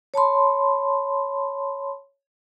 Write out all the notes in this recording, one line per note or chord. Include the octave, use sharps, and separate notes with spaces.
C#5 A5 B5 C6